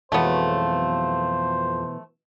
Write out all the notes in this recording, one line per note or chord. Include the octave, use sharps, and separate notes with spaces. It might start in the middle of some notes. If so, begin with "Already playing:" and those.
F2 B2 E3 F#3 G#3 A3 B3 C5